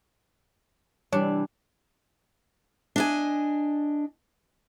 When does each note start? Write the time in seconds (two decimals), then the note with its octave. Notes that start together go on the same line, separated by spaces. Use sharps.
1.12 C3 E3 G3 D4 C#5
2.96 D4 D#5 G#5